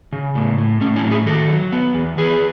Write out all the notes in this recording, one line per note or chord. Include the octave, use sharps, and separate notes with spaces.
C#3
A2
A2
A2 C#4
C#4 E4
F#3
E4 G#4
D#3 F#4 A4
F#3
B3
E2
E2 G#4 B4